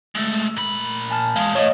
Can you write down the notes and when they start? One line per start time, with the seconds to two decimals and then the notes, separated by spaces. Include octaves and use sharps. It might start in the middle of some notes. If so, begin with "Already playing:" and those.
0.15 G#3 A3
0.57 A#2 B5
1.11 G#5 A5 F6
1.36 E2 G#3 F5 D#6
1.55 A2 C#5 D#5